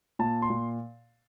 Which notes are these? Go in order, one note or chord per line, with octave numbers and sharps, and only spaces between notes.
A#2 A5
C6
A#2